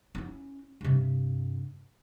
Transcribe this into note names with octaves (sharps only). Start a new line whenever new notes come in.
C#4 E4
G2 C3